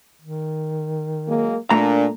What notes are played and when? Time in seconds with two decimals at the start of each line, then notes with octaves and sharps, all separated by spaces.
0.21 D#3
1.29 F#3 G#3 A#3
1.70 A#2 A3 D4 A#5